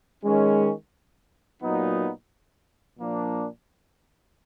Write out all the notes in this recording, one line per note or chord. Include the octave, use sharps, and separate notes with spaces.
D#3 G#3 C#4
A#2 F#3 B3 D#4
A#2 F3 A#3 D4